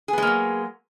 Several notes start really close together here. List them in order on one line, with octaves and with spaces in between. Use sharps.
G#4 B3 G#3 A#3 F#3